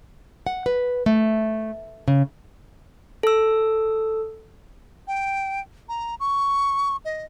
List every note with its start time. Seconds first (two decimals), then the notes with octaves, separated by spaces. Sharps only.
0.47 F#5
0.66 B4
1.06 A3
2.08 C#3
3.23 A4 E6
5.07 G5
5.89 A#5
6.20 C#6
7.05 D#5